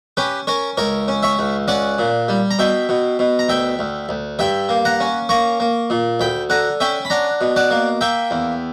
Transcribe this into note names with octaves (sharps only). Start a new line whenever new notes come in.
C#4 G4 B4
C#4 A#4 C#5
C#2 A#4 C#5
C#4
C#5 E5
C#2
C#4 D5 F#5
A#2
G3
A#5
B2 E5 G5
B2
B2
A#5
D2 E5 G5
D2
D2
G2 E5 G5
A#3
F#5 A#5
C#4
A#3 A#5 C#6
A#3
A#2
D2 G5 B5
D3 F#5 A#5
C#4 E5 G5
B5
D4 F#5 A#5
B2
D5 F#5
A#3
A#3 E5 G5
E2